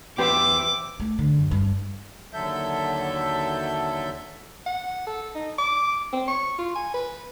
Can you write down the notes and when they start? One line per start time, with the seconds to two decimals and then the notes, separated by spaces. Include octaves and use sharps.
0.18 E2 B3 G4 B4 C5 E5 D6
1.00 A3
1.19 D3
1.39 F#2
1.51 G2
2.34 D#2 D3 F#3 A4 E5 G6
4.66 F#5
5.07 A4
5.35 D#4
5.58 D6
6.13 C4
6.28 C#6
6.58 F4
6.76 G#5
6.94 B4